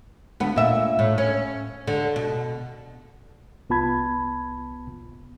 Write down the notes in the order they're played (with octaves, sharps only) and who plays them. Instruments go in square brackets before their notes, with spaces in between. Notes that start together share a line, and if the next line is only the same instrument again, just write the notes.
[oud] D2 B3
A#2 E5
A2
C#4
D3
B2
[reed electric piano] C2 B3 F4 A5 B5 G#6